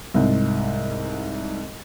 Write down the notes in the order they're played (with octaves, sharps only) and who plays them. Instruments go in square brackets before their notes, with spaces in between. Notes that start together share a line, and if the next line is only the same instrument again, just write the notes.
[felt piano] C2 G#2